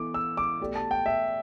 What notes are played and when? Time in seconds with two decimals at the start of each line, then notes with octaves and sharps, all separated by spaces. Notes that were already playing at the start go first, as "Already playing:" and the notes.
Already playing: E3 B3 E4 A4 D6
0.14 E6
0.37 D6
0.60 B2 A3 G4 D5
0.76 A5
0.91 G5
1.06 E5